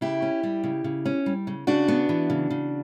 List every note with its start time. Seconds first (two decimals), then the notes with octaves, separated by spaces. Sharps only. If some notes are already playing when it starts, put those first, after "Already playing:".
0.01 C#3 E4 G4
0.22 C#4
0.43 G3
0.64 C#3
0.84 C#3
1.06 C#4
1.26 G3
1.47 C#3
1.67 C#3 D4 F#4
1.88 B3
2.09 E3
2.30 C#3
2.50 C#3